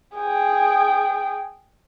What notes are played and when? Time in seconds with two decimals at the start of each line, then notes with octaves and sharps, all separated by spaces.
0.15 G#4 G5